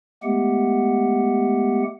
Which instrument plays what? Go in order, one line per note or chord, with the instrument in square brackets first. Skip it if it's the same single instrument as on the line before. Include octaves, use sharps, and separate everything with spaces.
[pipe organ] G#3 A3 B3 G4 F#5